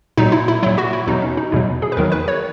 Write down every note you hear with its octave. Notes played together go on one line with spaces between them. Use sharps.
A#2 F#3 D#4
E4
E4
A#2 F#3 E4
F#4
E4
E2 B2 F#3 D#4
C#4
D#4
E2 B2 F#3 E4
G#4
B4
E2 D#3 F#3 A#4
B4
C#5